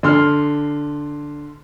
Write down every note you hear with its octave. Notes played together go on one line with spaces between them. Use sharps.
D3 C6 F6